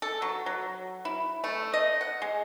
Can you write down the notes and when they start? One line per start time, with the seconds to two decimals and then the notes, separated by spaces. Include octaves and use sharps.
0.02 A4
0.22 F#3
0.46 F#3
1.05 E4
1.44 A3
1.74 D#5
2.01 F#5
2.22 G#3